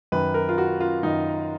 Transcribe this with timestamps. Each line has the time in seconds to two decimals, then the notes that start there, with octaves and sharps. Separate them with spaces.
0.12 F#2 D#3 B4
0.34 A#4
0.49 F4
0.58 F#4
0.80 F4
1.03 F#2 D#3 D#4